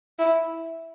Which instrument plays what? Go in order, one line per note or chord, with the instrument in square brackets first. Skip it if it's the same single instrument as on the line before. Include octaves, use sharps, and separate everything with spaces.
[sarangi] E4